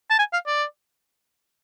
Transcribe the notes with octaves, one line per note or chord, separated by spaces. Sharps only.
A5
G#5
F5
D5